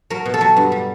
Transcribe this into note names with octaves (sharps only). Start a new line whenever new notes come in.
F#3 A#4
B2
A4
F#3
G2
G3